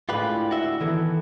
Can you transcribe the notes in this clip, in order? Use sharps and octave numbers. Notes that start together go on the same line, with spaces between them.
A2 D3 G#3 F4 G4 B4
F#4 E5
D#3 E3 B3 A4